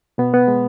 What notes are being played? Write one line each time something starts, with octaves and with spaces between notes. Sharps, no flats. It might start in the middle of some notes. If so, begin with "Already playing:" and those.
B2 B3
B3
G#3